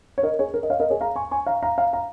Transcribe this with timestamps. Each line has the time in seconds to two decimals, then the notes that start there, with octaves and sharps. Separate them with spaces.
0.18 C#5
0.23 A#4 D#5
0.39 G#4 C#5
0.54 A#4
0.63 D#5
0.70 C#5 F5
0.80 A#4 D#5
0.90 G#4 C#5
1.01 F5 A#5
1.16 G#5 C#6
1.31 G#5 C#6
1.46 F5 A#5
1.63 F5 A#5
1.78 F5 A#5
1.93 F5 A#5